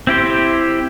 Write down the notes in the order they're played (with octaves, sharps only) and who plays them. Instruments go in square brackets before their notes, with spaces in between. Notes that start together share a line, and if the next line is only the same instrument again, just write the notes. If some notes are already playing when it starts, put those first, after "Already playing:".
[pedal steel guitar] C4 E4 G4 C5